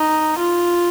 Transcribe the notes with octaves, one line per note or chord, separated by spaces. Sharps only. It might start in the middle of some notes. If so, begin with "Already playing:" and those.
Already playing: D#4
F4